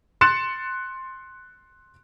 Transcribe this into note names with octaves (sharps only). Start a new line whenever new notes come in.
C6 F#6 A6 C#7 E7